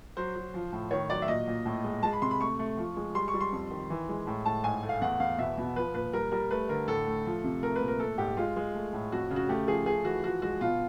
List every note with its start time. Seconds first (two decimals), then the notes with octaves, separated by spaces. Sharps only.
0.17 F#3 C5
0.36 F#3
0.54 F3
0.72 A2
0.91 D#3 C#5
1.10 F#3 D5
1.22 E5
1.28 A#2 D#5
1.47 A#2
1.65 A2
1.84 G#3
2.03 G#3 A5
2.13 B5
2.22 C3 C6
2.31 B5
2.41 A3 C#6
2.59 A3
2.77 F3
2.97 G#3
3.15 G3 C6
3.28 C#6
3.34 G3
3.40 C6
3.52 F2
3.71 D#3
3.90 E3
4.09 G#3
4.27 A2
4.45 A2 A5
4.64 G#2 G#5
4.83 A3
4.89 F5
5.01 E2 F#5
5.20 E2 F5
5.38 B2 E5
5.58 B2
5.76 F3 B4
5.94 A#2 B4
6.13 G3 A#4
6.32 G3 A#4
6.51 A3 B4
6.69 D3 A#4
6.88 A2 A4
7.07 A3
7.26 F3
7.44 C3
7.63 A3 A#4
7.76 B4
7.81 A#2
7.88 A#4
7.99 A3 A4
8.18 G#2 G4
8.37 G#3 F4
8.56 G#3
8.75 A3
8.93 A2
9.12 F2 F#4
9.30 C#3
9.36 F#4
9.49 A3 G4
9.68 F3 G#4
9.86 A3 G#4
10.05 E3 F#4
10.23 F3 F#4
10.42 G#3 F#4
10.61 B2 F4